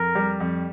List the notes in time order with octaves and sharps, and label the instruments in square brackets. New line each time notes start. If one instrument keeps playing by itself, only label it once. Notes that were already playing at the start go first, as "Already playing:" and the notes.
Already playing: [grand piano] F2 [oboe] A#4
[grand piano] G3
F2